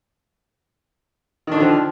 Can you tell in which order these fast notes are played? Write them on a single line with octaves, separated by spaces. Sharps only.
D#3 D4 D3 F3